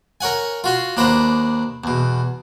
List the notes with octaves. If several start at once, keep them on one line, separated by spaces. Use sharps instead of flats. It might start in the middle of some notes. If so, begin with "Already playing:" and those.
A#4 C#5 F#5 G#5
F4 F#4 C6
D#2 D4 B4 C5 A#5
E2 B2